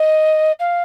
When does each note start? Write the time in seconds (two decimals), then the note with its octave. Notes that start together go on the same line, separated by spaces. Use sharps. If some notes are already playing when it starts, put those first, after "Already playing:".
Already playing: D#5
0.59 F5